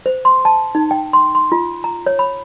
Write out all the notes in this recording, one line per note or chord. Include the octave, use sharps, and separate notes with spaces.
C5
C6
A5
D#4
G5
C6
C6
F4
A#5
C#5
B5